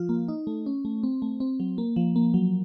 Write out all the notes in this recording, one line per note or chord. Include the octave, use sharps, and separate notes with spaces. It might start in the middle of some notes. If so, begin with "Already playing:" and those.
Already playing: F3 F4
A#3
D#4
A3
C#4
A3
C4
A3
C4
F#3
A#3
F3
A#3
F#3